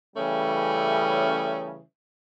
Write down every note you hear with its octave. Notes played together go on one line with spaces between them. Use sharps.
C#3 E3 G3 A3 C#4